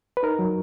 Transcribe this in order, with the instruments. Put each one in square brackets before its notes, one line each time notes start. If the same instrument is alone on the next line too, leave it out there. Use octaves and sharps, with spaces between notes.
[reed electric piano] B4
D#4 A#4
F#3